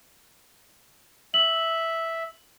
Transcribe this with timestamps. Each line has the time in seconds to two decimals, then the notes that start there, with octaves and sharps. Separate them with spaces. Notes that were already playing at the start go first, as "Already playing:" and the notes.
1.34 E5 F#7